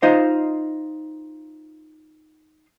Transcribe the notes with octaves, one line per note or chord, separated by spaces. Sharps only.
D#4 F4 C5 D#5 F5